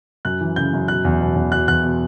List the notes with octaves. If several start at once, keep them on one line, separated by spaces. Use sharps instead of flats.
F#2 F#6
E3
C#3 G6
F#2
B2 F#6
E2
B2
E2
B2 F#6
E2 F#6
B2